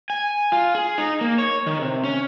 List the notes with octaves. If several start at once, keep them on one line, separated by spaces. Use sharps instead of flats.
G#5
F4
G#4
D#4
A#3
C#5
D#3
C3
C#4